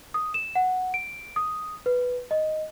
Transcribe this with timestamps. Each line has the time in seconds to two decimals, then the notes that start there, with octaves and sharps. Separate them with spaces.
0.14 D#6
0.34 E7
0.55 F#5
0.94 D7
1.36 D#6
1.86 B4
2.31 D#5